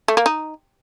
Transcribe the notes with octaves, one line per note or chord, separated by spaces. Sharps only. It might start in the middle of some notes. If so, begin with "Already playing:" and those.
A3
A#3
D#4